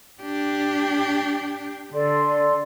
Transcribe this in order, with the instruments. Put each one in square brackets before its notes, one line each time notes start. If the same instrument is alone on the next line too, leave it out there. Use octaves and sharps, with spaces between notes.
[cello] D4 G4
[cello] D3 [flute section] A4 D5 C6